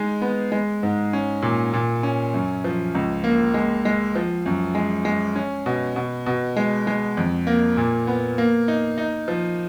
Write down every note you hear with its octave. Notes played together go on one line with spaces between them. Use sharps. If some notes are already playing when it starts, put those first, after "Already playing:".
Already playing: G#3 D#4
B3
G#3
G#2
C#4
A#2
A#2
C#4
F#2
F3
C#2
A#3
G#3
G#3
F3
F#2
G#3
G#3
C#4
B2
B2
B2
G#3
G#3
F2
A#3
A#2
B3
A#3
D#4
D#4
F3